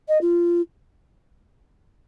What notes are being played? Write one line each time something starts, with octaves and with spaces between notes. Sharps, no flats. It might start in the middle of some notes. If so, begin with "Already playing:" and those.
D#5
F4